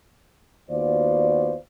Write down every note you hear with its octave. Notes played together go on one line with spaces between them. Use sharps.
D#2 B3 F4 F#4 C5 D5